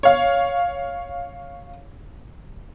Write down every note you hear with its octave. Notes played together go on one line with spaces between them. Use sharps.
C#5 F5